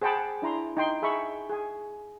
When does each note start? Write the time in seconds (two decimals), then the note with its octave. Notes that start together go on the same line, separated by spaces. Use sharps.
0.01 G#4 C5 F#5 G5 A5 B5
0.42 D4 E4 A#5 C6
0.77 D#4 G5 C6
1.02 G#4 E5 B5 C#6
1.49 G#4 G#5